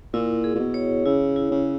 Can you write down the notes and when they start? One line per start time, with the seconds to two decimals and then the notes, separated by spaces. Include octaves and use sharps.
0.14 A#2 E4
0.44 G#4
0.55 A#2
0.60 B2
0.74 C#5
1.06 C#3 E4
1.36 E4
1.52 C#3